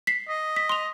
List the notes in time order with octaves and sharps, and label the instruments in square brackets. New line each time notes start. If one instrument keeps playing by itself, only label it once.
[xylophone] B6 C7
[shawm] D#5
[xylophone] B6
C6 F7